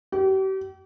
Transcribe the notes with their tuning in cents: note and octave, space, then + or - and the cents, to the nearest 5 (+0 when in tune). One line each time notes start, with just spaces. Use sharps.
G4 -40